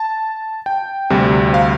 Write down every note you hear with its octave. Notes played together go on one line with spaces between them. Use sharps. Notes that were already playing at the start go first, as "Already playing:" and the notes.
Already playing: A5
G5
D2 C3 G3
F5